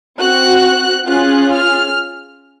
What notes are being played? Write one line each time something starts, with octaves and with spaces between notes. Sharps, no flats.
C4 F#4 F#6
C#4 F4 G#4 F#6
F6